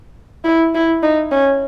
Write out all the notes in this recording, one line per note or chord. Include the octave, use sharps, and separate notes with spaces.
E4
E4
D#4
C#4